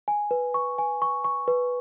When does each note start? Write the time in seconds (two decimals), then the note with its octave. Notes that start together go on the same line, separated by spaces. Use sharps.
0.08 G#5
0.31 B4
0.54 C#6
0.79 G#5
1.02 C#6
1.25 C#6
1.48 B4